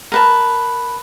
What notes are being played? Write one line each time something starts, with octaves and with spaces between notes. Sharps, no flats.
A#4 B4 A5